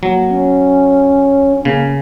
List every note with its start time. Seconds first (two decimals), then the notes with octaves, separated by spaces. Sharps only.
0.03 F#3 A#3
0.30 C#4
1.60 C#4
1.65 C#3 A#3